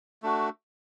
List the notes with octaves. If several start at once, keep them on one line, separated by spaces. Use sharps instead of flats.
A3 D4 F#4